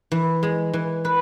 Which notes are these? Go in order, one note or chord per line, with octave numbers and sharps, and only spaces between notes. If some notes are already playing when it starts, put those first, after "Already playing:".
E3
G#3
E3
B4